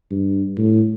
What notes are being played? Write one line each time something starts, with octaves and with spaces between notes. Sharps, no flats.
G2
A2